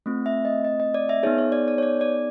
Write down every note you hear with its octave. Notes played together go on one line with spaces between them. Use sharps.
A3 C4 F4
E5
D#5
D#5
D#5
D5
E5
B3 D#4 G#4 C#5
C#5
D5
D5
C#5
D5
D5